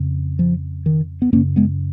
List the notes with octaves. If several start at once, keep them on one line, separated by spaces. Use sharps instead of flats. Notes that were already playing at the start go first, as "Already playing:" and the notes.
Already playing: F2 C#3
F3
D#3
B3
F#2 C#3 A#3 C#4
G#3 B3